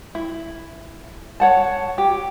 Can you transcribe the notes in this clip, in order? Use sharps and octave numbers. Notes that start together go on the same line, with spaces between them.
E4
C#5 F#5 A5
G4